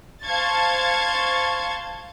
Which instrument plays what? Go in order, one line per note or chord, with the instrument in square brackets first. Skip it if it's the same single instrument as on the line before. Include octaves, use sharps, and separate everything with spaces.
[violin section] C5 F5 A5 C#6 G#6 A6